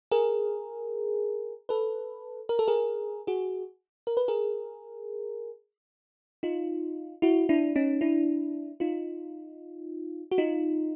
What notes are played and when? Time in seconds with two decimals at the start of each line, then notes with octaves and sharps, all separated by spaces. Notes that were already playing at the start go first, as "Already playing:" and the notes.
0.11 G#4 A#4
1.69 A4 B4
2.49 A#4
2.59 A4
2.67 G#4 A#4
3.27 F#4 G#4
4.07 A#4
4.17 B4
4.28 G#4 A#4
6.43 D#4 F4
7.22 E4 F#4
7.49 D4 E4
7.76 C#4 D#4
8.01 D4 E4
8.80 D#4 F4
10.31 F#4
10.38 D#4 F4